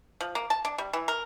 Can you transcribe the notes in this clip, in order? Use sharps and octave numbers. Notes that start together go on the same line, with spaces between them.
F3
A#3
A5
D4
G3
E3
A#4